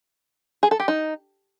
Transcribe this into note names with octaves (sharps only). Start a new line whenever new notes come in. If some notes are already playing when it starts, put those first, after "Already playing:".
G#4
A4
G4
D#4